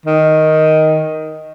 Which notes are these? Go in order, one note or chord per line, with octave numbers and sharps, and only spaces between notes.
D#3